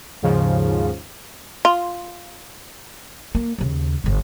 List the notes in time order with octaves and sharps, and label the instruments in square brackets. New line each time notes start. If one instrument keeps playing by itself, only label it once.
[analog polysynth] D#2 G#2 C#3 F3
[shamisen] F4
[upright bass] A#3
D#2 C#3
G1 D3